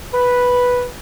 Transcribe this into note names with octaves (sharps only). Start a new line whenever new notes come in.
B4